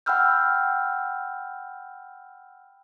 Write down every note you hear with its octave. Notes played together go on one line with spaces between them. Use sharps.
F#5 G5 B5 E6 F6 G6